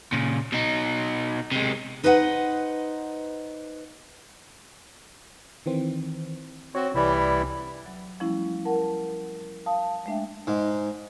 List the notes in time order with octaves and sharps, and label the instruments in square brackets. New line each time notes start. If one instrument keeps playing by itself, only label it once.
[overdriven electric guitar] A#2 C#3
B2 D#4
C3 G#3
[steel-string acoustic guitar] D#4 B4 C5 D#5 F#5
[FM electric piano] D#3 E3 C4
[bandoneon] C4 F#4 [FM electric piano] C#5
[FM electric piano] C2 D5 [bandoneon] E3 G3 E4
[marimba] F#3
F3 G3 A3 C#4 E4
A#4 F#5 A5
F5 A5 D#6
G#3 A3 D4 E5 G5
[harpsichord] G#2